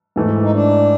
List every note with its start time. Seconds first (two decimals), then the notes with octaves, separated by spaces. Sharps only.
0.16 G#2 E3 A3
0.42 D#4
0.51 D4